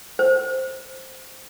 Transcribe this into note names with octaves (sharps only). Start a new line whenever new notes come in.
C5